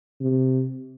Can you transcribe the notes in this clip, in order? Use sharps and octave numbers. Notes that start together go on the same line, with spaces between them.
C3